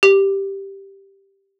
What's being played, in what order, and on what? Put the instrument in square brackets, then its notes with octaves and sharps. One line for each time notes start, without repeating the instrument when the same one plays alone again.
[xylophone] G4